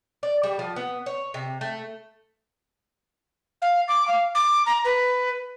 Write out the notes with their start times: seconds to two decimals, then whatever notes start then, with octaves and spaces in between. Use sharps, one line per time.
0.23 D5
0.43 G3
0.59 F3
0.76 B3
1.06 C#5
1.34 C3
1.61 A3
3.62 F5
3.88 D6
4.08 F5
4.35 D6
4.66 A#5
4.85 B4